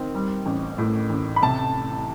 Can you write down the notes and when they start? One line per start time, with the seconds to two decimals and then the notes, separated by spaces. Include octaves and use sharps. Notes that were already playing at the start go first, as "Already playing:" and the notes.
Already playing: D#3 C4
0.15 G3
0.46 A1
0.78 A2
1.10 A1
1.36 B5
1.43 C3 A5